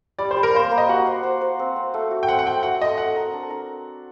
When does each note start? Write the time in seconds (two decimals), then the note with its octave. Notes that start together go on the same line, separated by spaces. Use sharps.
0.19 G3 D5
0.31 C5
0.36 G3
0.43 A#4
0.54 A#3 C5
0.72 A#3
0.78 D#5
0.89 F#4 F#5
1.07 C5
1.23 C5
1.41 C5
1.59 C4
1.76 C4
1.94 A3
2.11 F#4
2.23 G5
2.28 C4 F#5
2.39 F#5
2.46 A3 G5
2.63 F#4 F#5
2.81 A3 D#5
2.98 A3 F#5
3.16 A#4
3.33 D4
3.50 A#4